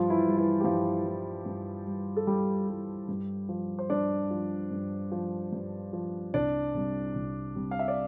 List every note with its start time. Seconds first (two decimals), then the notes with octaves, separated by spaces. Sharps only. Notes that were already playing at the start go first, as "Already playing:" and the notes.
Already playing: G2 F3 F4
0.10 E3 E4
0.24 E3 G3
0.38 E3 E4
0.61 G4
0.64 G2 F3 F4
1.05 E3 G3
1.46 G2
1.87 E3 G3
2.16 A4
2.27 G2 G3 G4
2.68 E3 G3
3.08 G2
3.49 F3
3.79 C5
3.90 G2 D4 D5
4.31 F3
4.71 G2
5.12 F3
5.53 G2
5.93 F3
6.34 C2 D4 D5
6.74 C3 G3
7.15 C2
7.56 C3 G3
7.71 F5
7.79 E5
7.88 D5